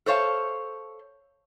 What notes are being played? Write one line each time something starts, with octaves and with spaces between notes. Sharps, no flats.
A4 C5 C#5 F5 A5